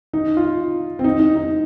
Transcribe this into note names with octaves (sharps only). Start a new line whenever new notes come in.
D#4
F4
C4
D#4
D#4
D#4